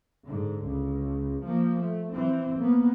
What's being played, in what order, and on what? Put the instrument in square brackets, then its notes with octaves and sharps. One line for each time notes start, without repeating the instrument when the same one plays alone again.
[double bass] G#2 D3
C#2
F3 A#3
A3
E3 C4
A#3 B3